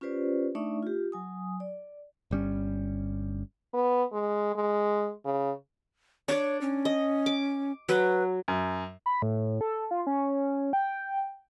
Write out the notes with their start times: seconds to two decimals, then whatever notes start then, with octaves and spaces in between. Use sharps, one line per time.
0.01 C#4 F4 G4 B4 C5 D5
0.55 A3 D4 D#4 D5 E5 C#6
0.83 F4 G4
1.12 F#3 G#5 D#6
1.60 D5
2.31 G1 G3 C#4
3.74 B3
4.13 G#3
4.56 G#3
5.25 C#3
6.28 D4 C#5 D5
6.61 C#4
6.85 D#5
7.26 D6
7.89 F#3 B4
8.48 F#2
9.06 B5
9.22 A2
9.61 A4
9.91 F4
10.07 C#4
10.73 G5